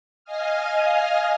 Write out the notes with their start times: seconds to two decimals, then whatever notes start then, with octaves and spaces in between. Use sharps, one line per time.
0.25 D#5 F5 G#5 D#6 F6